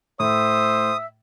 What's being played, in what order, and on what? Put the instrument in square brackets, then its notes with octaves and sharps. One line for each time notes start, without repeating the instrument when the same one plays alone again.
[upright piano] A2 [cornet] C5 [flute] E5 [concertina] D#6